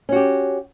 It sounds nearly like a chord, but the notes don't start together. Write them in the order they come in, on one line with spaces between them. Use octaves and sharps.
C#4 F#4 G4